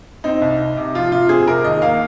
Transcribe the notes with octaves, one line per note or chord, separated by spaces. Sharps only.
C4 D#4
C2
C2
C3
F3 F4
C3 F4
C4 G#4
C3 A#4
D#2 D#5
A#3 F5